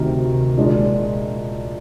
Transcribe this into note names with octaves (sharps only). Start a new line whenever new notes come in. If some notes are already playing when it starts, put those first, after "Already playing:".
Already playing: D2 C3 D#3 A#4
A#2 G#3 D4 F4